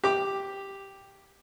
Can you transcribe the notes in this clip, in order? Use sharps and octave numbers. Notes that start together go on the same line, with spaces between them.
G4 D6